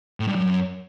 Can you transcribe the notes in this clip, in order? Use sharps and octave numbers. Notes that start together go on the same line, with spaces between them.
A2
G2
F#2